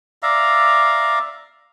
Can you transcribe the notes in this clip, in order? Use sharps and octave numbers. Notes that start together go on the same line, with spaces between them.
D5 E5 F5 A#5